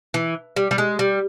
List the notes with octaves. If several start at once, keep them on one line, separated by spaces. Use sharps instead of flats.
E3
G3
G3
G#3
G3